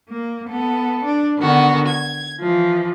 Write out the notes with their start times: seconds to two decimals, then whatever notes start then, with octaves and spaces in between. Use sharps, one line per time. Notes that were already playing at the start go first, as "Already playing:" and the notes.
0.10 A#3
0.50 B3 A4
1.05 D4
1.38 D3 D#3 B3 F#4
1.86 G#6
2.39 E3 F3